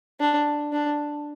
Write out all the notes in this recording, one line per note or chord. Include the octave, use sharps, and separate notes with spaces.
D4
D4